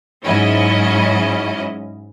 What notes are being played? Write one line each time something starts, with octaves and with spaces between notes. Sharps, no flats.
G#2 F#3 C#4 E4 D#5